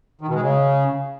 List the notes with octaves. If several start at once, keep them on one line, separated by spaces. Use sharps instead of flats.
D#3
B2
G#3
C#3